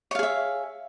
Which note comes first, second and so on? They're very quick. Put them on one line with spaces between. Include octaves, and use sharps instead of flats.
C#5 F5 G#4 E5